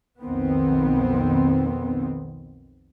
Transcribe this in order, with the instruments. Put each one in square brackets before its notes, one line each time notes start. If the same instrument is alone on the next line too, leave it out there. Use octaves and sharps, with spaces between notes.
[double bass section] B1 F2 D#3 B3 C4